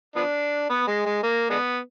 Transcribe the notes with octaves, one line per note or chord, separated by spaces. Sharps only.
F3 B3 D4
B3
G#3
G#3
A#3
D3 G#3 B3